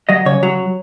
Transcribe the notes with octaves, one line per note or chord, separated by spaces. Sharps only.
F#3 D#5
C#3 C#5
F#3